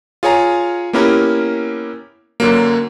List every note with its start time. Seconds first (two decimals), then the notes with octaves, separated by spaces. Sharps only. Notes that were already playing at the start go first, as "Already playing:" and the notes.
0.23 F4 G#4 C#5 G#5 A#5
0.93 A#3 B3 C#4 E4 G4 A#4
2.40 F#2 D3 F#3 A#3